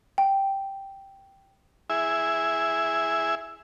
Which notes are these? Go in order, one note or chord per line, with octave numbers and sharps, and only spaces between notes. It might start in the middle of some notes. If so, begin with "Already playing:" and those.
G5
E4 G#4 E5